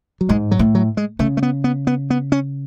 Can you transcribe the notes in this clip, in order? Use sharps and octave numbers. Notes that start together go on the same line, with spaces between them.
F#3
G#2 G#3
F#3
A2
F#3
G#3
C#3 A3
A3
B3
B3
B3
B3
C#4